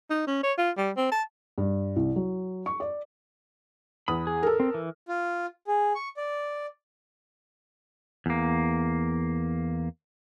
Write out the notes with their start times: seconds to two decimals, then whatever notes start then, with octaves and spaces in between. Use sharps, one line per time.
0.10 D#4
0.27 C#4
0.43 C#5
0.58 F4
0.78 G3
0.97 C4
1.12 A5
1.58 G2
1.96 C2
2.16 F#3
2.66 C#6
2.80 D5
4.08 E2 B5 D#6
4.27 G#4
4.43 A4 A#4
4.60 C4
4.74 E3
5.08 F4
5.67 G#4
5.95 C#6
6.17 D5
8.26 E2 A#3